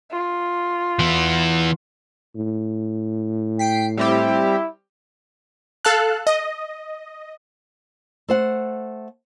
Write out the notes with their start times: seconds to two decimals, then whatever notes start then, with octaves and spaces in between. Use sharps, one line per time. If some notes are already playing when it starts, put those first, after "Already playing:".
0.12 F4
0.99 E3 B3
2.35 A2
3.59 G5 B6 C7 D7
3.97 G3 C4 E4 G4
5.85 A4 F5 A5 F#6
6.27 D#5
8.28 A3 C5 F#5